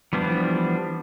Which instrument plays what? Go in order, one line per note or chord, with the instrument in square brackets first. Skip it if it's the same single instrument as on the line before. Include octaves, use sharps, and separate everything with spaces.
[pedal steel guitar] E3 F3 G3 B3 D4